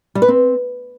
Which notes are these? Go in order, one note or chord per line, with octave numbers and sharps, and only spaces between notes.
G3
B4
C4